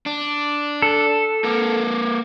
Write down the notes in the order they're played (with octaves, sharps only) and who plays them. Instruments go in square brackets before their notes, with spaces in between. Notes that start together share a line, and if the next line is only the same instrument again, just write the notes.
[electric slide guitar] D4
[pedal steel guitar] A4
[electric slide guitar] A#3 A#4 B4